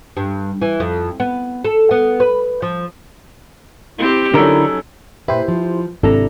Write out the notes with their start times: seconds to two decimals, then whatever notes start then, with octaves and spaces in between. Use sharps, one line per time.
0.17 G2
0.62 E3
0.80 F2
1.20 B3
1.64 A4
1.91 B3
2.20 B4
2.62 F3
3.98 C4 E4 G4
4.34 D3 F#3 C#4 D#4 E4 A4 A#4
5.28 A#2 E4 G4 B4 C5
5.48 F3
6.03 G#1 C3 D4 E4 A4 A#5